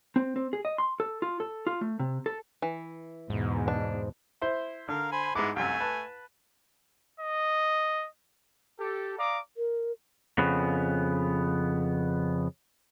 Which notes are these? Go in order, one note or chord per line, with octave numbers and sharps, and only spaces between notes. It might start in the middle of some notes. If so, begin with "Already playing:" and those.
C4
C4
G#4
D#5
C6
A4
F4
A4
F4
A3
C3
A4
E3
E2 G#2 B2
D4
E4 C5
D3 A#4 F5
C5 G#5 B5
G#2 G#3 B3 E4 D6
C2 F#2 A3 G#5
B4 A5
D#5
G4 A4
D5 F5 A#5 D6 D#6
A#4
F2 C#3 B3